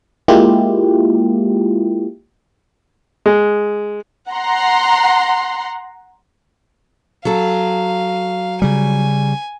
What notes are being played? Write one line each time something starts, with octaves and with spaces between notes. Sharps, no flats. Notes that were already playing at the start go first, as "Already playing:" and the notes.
G#3 A#3 E4 F4 G4
G#3
F#5 A#5 C6
F#3 A4 F5
C#3 G3 G#5